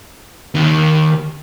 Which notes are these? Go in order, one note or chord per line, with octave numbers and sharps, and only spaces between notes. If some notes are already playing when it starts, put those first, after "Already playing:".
D#2 D#3